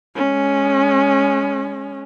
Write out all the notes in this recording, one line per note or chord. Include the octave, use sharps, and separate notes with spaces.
G#3 C#4